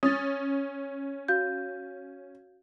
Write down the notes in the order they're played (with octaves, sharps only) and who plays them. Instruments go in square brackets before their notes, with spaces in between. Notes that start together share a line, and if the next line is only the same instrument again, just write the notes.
[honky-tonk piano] C#4 [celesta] D#6 A6
[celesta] F#4 F5 G6